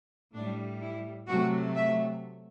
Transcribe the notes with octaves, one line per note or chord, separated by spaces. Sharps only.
A2 G3 D4
E4
C3 F#3 A3 F#4
E5